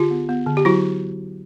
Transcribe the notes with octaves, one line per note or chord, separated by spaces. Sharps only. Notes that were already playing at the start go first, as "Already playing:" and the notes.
Already playing: D3 F4 G4
B3
B3
D3
G4
F#3 E4 F#4